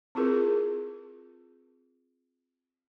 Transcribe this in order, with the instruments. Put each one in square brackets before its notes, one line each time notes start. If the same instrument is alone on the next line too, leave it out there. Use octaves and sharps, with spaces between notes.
[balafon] C4 E4 F4 G#4 A#4 B4